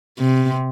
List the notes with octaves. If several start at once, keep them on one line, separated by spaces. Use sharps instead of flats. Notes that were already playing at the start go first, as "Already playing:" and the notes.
C3